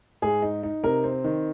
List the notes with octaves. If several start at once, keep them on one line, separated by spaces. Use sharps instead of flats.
G#2 G#4
D#4
D#4
C3 A#4
C4
D#3